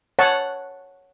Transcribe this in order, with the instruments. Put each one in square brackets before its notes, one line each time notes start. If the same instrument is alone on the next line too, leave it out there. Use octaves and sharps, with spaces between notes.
[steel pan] C#5 F#5 A5